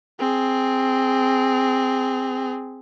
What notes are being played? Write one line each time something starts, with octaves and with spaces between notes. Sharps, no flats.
C4 G#4